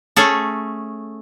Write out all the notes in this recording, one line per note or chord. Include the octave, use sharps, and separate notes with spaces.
A3 C#4 G#4 A4